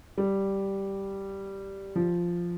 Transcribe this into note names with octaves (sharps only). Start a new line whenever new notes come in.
G3
F3